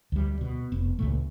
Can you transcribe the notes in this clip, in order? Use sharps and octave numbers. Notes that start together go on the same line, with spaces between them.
D2 G3
B2
F1 B3
C#2 A#2 A3